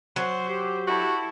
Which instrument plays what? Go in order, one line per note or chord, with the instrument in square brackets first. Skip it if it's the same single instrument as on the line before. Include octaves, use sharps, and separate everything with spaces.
[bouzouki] F#3 [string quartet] C5
[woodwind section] G4
[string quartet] E4 A4 [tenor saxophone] F#4